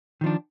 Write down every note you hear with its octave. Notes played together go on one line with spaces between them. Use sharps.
D#3 F3 D4